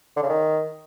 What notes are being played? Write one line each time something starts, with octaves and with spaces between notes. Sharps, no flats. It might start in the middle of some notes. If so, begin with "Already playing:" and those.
D3
C#3
D#3